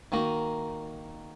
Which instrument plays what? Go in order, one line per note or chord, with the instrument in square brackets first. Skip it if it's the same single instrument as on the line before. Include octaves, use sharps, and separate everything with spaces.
[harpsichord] D#3 A#3 D#4 F#4